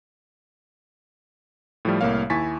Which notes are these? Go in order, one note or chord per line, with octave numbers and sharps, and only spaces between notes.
A2 F3 G3
C2 A2 A#3 C#5 F5
D#2 E4 G#5 C#6 A6 B6